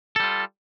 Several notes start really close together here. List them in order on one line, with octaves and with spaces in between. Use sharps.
A4 G3 F4